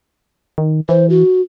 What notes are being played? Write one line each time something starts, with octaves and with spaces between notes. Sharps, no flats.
D#3
E3 C5
F#4